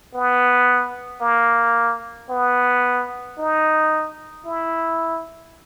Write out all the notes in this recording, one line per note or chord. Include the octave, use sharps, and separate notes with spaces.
B3
A#3
B3
D#4
E4